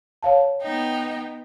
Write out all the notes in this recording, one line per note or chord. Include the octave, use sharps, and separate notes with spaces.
C#5 F5 A5
B3 D#4 G5